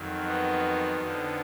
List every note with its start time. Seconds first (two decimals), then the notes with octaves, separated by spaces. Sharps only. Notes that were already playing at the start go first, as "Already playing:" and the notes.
Already playing: F2 D#3 F#3
0.25 B3 D#4
1.01 F2 D3 F3